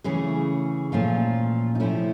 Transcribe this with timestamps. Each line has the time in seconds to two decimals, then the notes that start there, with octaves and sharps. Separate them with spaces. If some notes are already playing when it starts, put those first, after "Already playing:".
0.04 C#3 E3 A3 C#4 G#4
0.92 A#2 F3 A3 C#4 F4
1.75 D#4
1.80 C3 F3 A3 C#4 E4